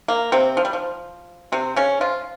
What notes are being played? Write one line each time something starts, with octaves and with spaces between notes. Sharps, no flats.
A#3
C3 C4
F3
G3
F3
C3 C4
C#3 C#4
F3 F4